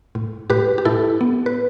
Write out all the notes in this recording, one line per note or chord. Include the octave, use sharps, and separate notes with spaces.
A2
A2 G4 B4
G4
A2 E4 A4
B3
B4